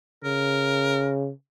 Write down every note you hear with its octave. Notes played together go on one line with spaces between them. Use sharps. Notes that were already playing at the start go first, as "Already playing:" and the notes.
C#3 A#4